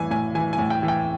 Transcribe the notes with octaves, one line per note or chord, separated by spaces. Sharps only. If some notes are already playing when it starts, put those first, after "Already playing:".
Already playing: A2 E3 G#5
A2 G#5
E3 G#5
G#5
A2
G5
E3
G5